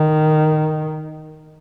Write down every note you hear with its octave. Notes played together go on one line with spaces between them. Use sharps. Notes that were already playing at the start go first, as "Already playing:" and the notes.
Already playing: D#3